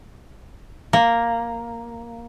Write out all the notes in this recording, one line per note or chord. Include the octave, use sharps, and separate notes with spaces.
A#3